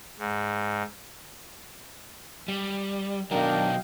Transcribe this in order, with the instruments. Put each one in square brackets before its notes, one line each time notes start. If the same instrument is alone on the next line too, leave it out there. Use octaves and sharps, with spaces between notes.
[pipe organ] G#2
[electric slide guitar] G3
[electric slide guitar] B2 D#3 F#3 [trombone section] D4 A#4 [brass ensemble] D#5 F5 G5